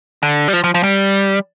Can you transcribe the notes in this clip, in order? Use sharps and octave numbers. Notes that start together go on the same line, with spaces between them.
D3
G3
F3
F3
F3
G3